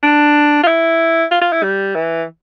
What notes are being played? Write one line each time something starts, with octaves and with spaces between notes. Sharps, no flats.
D4
F4
E4
F4
F4
E4
G3
E3